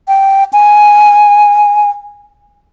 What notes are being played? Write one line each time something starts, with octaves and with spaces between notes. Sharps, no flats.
G5
G#5